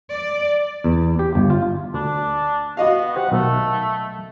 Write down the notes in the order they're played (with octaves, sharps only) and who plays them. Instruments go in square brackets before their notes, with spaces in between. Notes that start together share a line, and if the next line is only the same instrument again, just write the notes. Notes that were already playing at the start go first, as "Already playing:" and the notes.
[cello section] D5
[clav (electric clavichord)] E2
G4
G1
F4
[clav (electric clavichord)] D2 [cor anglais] D4
[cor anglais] B3 [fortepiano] F#4 D#5 F5
[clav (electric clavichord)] G4 C5 [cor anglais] F#5
[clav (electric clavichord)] B1 D#3 [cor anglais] A3